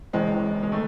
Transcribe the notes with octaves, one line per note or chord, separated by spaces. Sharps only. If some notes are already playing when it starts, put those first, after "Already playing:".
E1 E2 C#3 E3 G#3 C4
G#3
D#3 A3